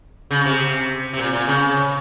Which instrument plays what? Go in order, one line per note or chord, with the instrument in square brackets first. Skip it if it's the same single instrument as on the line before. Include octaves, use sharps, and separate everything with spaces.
[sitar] C#3
C3
C3
A#2
A#2
C#3